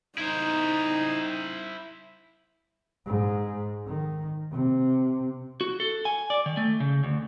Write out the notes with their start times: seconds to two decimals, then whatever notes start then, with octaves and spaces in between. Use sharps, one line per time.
0.18 D#4 E4 C5
3.06 G#2
3.86 D#3
4.52 C3
5.61 F#4
5.80 A4
6.05 G#5
6.30 D5
6.46 D#3
6.57 A3
6.80 C#3
7.04 D2